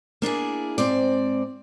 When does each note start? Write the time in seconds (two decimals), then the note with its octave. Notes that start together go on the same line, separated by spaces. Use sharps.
0.22 A#3 D4 E4 G#4
0.78 G#2 C4 D5